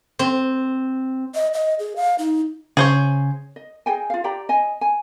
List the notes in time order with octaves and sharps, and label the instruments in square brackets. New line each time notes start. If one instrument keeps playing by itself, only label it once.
[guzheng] C4
[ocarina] D#5
D#5
G#4
F5
D#4
[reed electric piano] C#3 [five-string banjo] G#4 C5 C#5
[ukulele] D#5
G#4 D#5 G5 G#5
F4 F5
G4 D5 G5 A#5
D#5 G#5
G#5